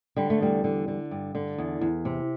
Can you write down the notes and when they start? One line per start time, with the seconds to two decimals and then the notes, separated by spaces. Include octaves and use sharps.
0.16 D3 G3
0.30 A3
0.40 E2 G3
0.64 D3
0.88 D3
1.11 G2
1.35 D3
1.58 E2
1.81 E2
2.05 C3